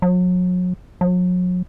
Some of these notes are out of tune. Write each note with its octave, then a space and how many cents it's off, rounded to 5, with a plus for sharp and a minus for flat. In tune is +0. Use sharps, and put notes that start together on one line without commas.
F#3 -35
F#3 -40